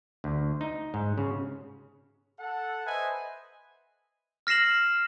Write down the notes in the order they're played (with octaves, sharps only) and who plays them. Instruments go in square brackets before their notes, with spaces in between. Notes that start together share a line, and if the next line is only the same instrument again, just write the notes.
[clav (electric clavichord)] D2
D#4
G#2
C#3
[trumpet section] A4 F#5
B4 C5 D#5 E5 G#5
[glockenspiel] F6 A#6 C7 E7 F#7